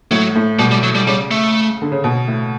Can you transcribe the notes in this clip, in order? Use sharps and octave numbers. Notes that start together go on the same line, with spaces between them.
A2 F#3
A2
B2 G3
G3
F#3
G3
C#3 G3
A3
D3
C#3
B2
A2